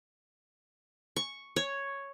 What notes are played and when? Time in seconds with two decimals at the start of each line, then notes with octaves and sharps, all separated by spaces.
1.16 C#6
1.56 C#5